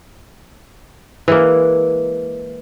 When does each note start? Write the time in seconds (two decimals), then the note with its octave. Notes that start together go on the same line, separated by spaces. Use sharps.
1.28 E3 G#3 A#3